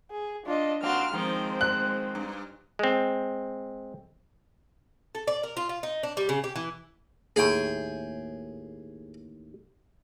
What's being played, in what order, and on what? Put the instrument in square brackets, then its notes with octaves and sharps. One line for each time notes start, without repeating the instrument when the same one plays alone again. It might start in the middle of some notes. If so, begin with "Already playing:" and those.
[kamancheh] G#4
[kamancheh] D4 D#5 [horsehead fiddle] F4
[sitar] A#2 C4 D4 [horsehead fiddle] F#4 F5 [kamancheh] C6 F6
[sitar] D#3 F3 [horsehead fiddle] G#3 C4 [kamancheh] C5
[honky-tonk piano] F#6
[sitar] G2
[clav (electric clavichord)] G#3 C4
[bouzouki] A4
D5
A#4
F4
F4
D#4
D4
G3
C#3
G4
E3
[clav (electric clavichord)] D#2 A2 [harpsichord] G#4 G5